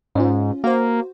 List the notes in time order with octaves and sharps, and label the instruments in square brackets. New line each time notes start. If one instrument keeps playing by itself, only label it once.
[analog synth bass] G#2 [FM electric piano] C#4 F4
[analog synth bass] A#3 [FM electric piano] F#4 C5